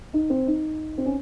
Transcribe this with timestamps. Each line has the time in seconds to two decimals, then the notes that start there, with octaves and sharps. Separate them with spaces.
0.14 D#4
0.30 C4
0.47 D#4
0.98 C4
1.06 C#4